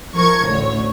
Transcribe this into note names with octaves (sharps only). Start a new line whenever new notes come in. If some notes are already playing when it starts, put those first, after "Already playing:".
F3 A#4 C#6 G#6
A1 D2 C#5